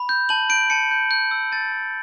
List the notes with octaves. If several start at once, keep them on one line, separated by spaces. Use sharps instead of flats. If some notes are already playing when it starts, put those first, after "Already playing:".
Already playing: B5
G6
A5 F#7
G6 D7
A5 C#7
G6
G6
E6
A5 A6
A5